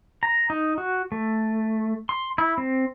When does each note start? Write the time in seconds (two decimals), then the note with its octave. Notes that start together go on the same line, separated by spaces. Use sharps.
0.23 A#5
0.50 D#4
0.78 F#4
1.12 A3
2.09 C6
2.38 E4
2.58 C4